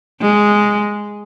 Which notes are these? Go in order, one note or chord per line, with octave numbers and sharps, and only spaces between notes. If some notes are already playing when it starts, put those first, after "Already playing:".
G#3